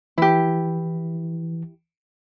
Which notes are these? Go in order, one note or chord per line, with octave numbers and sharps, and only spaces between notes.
E3 E4 G4